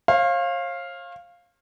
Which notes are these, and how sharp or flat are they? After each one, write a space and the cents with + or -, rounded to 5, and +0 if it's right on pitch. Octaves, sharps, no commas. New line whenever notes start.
C#5 -45 F5 +0